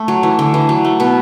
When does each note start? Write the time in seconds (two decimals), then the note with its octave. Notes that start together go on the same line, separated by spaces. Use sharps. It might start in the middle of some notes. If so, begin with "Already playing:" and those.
Already playing: A3
0.08 F#3
0.23 E3
0.39 D3
0.54 E3
0.69 F#3
0.85 A3
1.00 B2 B3